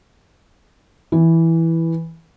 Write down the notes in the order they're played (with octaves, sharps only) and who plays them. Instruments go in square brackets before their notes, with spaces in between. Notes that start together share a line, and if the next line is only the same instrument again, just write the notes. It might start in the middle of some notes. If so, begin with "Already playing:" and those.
[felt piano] E3